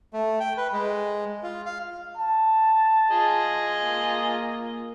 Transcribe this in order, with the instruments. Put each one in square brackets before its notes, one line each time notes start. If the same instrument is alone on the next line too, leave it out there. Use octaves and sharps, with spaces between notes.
[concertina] A3
G5
B4
G#3
F4
F5
[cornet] A5
[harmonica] F4 G#4 D#5
[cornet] A#3